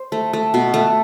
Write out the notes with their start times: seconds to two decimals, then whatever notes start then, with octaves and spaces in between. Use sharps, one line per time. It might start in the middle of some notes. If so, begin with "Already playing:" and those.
Already playing: C5
0.12 A3
0.33 A3
0.54 B2
0.74 A3